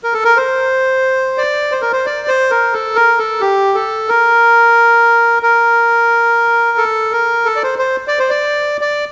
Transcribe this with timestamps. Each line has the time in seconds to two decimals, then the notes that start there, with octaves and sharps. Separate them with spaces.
0.03 A#4
0.13 A4
0.24 A#4
0.37 C5
1.38 D5
1.72 C5
1.82 A#4
1.92 C5
2.06 D5
2.28 C5
2.51 A#4
2.73 A4
2.95 A#4
3.18 A4
3.41 G4
3.74 A4
4.08 A#4
5.43 A#4
6.77 A4
7.12 A#4
7.45 A4
7.56 D5
7.63 C5
7.79 C5
8.08 D5
8.19 C5
8.30 D5
8.81 D5